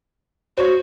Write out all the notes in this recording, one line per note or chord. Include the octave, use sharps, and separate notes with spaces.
F#4 C5 C#5